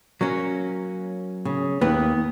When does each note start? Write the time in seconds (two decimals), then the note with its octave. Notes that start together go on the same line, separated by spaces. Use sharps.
0.21 F#3 A#3 C#4
1.45 C#3
1.81 D#2 B3 B4